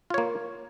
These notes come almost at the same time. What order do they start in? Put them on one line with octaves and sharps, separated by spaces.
F4 C#5 A#3